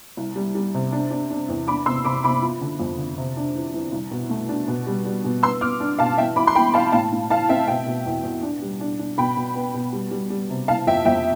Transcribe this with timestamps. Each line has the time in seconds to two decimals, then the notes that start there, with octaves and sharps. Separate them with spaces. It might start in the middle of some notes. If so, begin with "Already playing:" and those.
0.17 C2
0.36 G3
0.55 G3
0.74 C3
0.92 D4
1.11 D4
1.30 D4
1.48 E2
1.67 D4 B5 D6
1.86 C3 C6 E6
2.05 C3 B5 D6
2.24 C3 B5 D6
2.42 F3
2.61 D3
2.80 F2
2.98 D3
3.18 C3
3.37 D4
3.55 E3
3.74 E3
3.92 C2
4.11 B2
4.30 A3
4.49 D4
4.68 B2
4.87 G3
5.05 G3
5.24 B2
5.43 B3 C6 E6
5.61 B3 D6 F6
5.80 D4
5.99 B2 F5 A5
6.18 E3 E5 G5
6.36 E3 B5 D6
6.47 C6
6.55 E3 G5 B5
6.74 E3 F5 A5
6.92 A2 F5 A5
7.12 A2
7.30 E3 F5 A5
7.49 C4 E5 G5
7.68 B2 E5 G5
7.86 B2
8.06 E2
8.24 E2
8.43 D4
8.62 G3
8.81 D4
8.99 D4
9.18 B2 G5 B5
9.37 B2
9.56 B3
9.74 B2
9.93 G3
10.11 G3
10.30 G3
10.50 C3
10.68 E3 F5 A5
10.87 F2 E5 G5
11.05 F2 E5 G5